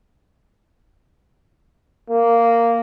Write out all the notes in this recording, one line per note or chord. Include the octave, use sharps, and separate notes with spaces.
A#3